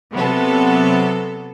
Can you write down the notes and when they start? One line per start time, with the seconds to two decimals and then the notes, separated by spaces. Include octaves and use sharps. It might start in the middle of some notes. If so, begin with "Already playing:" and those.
0.13 C3 F#3 B3 A4